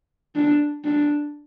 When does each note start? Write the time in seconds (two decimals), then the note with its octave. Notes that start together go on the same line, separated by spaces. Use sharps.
0.35 D4
0.85 D4